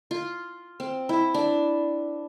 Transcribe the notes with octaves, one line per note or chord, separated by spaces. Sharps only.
F4
C4
E4
D4